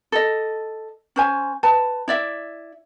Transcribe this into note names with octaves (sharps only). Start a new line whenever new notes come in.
A4 D#5
C#4 C5 G#5
B4 A5
E4 D5 E5